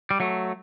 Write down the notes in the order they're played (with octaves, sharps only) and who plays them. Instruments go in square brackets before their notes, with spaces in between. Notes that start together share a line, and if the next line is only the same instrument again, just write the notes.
[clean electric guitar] G3
F#3 A3